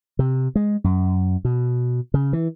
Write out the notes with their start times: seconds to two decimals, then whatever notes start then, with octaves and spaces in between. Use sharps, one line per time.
0.19 C3
0.56 G#3
0.84 F#2
1.45 B2
2.14 C#3
2.33 E3